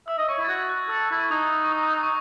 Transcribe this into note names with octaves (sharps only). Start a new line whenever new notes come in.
E5 E6
D#5
C#5 C#6
E4
A6
F#4 G#6
F#6
A4 E6
E4
C#6
D#4 D#6
C#6
D#6
D#6
D#6
C#6